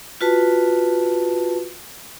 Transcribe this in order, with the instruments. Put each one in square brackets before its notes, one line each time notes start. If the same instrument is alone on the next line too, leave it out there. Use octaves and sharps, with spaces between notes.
[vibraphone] F4 F#4 B4 A5